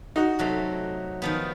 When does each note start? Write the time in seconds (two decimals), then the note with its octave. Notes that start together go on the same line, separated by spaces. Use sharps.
0.16 D#4 F#4
0.39 C3 F#3 A3
1.22 D#3 F3 B3